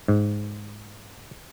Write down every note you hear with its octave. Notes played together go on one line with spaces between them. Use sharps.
G#2